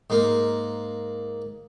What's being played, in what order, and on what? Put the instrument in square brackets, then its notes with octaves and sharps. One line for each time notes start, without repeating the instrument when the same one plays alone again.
[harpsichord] G#2 A#3